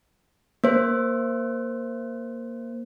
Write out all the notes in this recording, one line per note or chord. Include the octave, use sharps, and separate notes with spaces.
A#3 C5